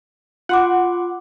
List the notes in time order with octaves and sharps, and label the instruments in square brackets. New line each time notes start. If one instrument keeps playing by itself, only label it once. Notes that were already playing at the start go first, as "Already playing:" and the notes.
[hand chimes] F4 C6 D6 [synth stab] F#5